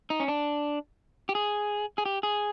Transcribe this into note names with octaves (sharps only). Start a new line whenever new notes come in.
D#4
C#4
D4
G4
G#4
G#4
G4
G#4